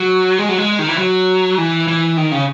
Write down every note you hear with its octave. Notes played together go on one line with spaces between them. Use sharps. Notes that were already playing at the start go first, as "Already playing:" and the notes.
Already playing: F#3
G#3
F#3
G#3
D#3
E3
F#3
E3
E3
D#3
C#3